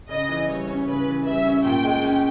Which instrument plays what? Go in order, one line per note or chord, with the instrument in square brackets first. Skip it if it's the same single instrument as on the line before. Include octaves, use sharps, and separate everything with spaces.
[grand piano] C#3 [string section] D#5
[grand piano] E3
[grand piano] G3 [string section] C#5
[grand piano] C#4
[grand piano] C#3 [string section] B4
[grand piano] E3
[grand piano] G3 [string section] E5
[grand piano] C#4
[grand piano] A#2 [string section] G5
[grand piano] G#3
C#4